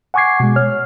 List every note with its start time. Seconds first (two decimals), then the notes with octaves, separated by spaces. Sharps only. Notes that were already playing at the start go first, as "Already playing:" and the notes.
0.14 F#5 G#5 C#6 D6 G#6 C7
0.40 B2 G#3
0.56 C#5 F6